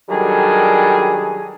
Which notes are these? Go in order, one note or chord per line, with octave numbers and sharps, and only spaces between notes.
D#3 F#3 G3 D4 G#4 A4